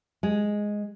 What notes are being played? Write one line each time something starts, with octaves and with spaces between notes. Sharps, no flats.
G#3